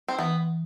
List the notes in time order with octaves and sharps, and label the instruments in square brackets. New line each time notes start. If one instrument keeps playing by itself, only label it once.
[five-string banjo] C4
[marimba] E3 [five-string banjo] B3